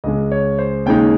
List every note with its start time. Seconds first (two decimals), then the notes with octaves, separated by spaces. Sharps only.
0.04 C#2 C#3 G#3 D#5
0.31 C#5
0.59 C5
0.86 D#2 C#3 G#3 D#4 G5